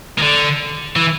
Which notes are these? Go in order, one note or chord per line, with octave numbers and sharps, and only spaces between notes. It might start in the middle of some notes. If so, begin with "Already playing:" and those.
D#3
D3
E3